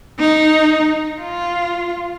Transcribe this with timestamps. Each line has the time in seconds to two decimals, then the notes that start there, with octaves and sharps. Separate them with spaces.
0.20 D#4
1.21 F4